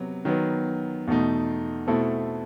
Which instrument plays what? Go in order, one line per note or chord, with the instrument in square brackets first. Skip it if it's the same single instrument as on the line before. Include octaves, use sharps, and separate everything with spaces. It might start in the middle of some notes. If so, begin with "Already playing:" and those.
Already playing: [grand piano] C3 F#3 B3
D#3 F#3 B3
E2 B2 A3 D#4
B2 A3 C4 E4 A4